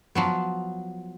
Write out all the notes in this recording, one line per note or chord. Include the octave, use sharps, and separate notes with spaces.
F3 F#3 B3